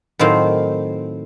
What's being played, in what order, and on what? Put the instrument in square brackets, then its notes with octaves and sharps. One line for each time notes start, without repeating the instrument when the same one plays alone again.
[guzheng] A2 D#3 F#3 C4 F5